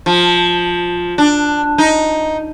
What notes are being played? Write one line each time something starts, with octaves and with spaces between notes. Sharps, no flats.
F3
D4
D#4